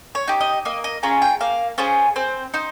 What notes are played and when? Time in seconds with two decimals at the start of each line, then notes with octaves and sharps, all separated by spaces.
0.15 C#5
0.28 D#4 G4
0.41 D#5
0.65 A#3 D#5
0.84 D#5
1.03 C#4 F4 G#4 A#5
1.22 G5
1.40 A#3 F5
1.78 C#4 F4 G#4 C5
2.16 C4 C5
2.54 D#4 C5